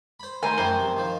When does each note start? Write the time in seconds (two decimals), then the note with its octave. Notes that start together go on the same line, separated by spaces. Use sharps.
0.20 C5 B5
0.43 D#3 A3 A#4 C5 G#5 A#5 B5
0.58 F#2 E3 A3 A#4 C5 G5
0.79 C3
0.97 D#3 F3